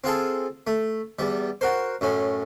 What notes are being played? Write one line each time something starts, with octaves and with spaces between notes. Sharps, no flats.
C4 F4 G#4 A4
A3
E2 G3
F#4 A#4 C5
F#2 A2 C#4